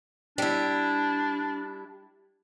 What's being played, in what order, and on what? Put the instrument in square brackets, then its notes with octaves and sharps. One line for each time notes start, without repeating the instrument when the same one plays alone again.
[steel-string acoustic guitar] G3 E4 [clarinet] D4